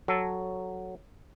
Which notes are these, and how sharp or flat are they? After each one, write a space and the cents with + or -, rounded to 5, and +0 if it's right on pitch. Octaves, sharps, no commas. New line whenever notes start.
F#3 +0 A4 +0